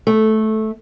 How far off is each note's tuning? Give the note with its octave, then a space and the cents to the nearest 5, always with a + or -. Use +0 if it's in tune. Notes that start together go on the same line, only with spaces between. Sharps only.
A3 -10